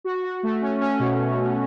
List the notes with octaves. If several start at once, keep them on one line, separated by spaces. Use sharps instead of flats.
F#4
F#4
A3
C#4
C#4
B2